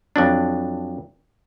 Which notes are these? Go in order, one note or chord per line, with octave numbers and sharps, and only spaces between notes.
F2 F#3 D4